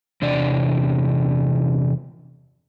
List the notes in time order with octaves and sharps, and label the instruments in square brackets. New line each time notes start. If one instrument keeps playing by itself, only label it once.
[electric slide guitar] E2 C3 D4 D5